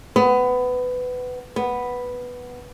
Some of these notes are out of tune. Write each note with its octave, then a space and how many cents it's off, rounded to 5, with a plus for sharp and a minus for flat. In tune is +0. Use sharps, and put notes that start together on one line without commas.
B3 +20
B3 +0